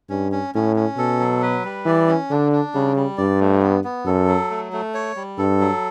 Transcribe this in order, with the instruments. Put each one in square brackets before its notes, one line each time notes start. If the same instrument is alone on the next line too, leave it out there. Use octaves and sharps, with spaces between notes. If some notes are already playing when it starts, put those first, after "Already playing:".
[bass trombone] G2 [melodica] C#4
[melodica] C#4
[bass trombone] A2 [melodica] C#4
[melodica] C#4
[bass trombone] B2 [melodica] A4
[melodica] F#3
B4
G3
[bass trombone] E3 [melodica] D5
[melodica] C#4
[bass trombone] D3 [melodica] D4
[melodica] D4
[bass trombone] C#3 [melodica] G3
[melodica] G3
[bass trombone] G2 [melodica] D5
[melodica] A3
B3
B3
[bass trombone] F#2 [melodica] A4
[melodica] F#3
A3
A3
C#5
G3
[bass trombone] G2 [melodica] A4
[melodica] F#3